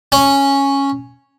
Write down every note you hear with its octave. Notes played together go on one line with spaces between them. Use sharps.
C#4